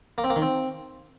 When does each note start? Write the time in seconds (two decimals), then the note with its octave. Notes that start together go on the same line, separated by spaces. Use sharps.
0.18 A#3
0.24 C4
0.30 A#3
0.36 D#3
0.42 C4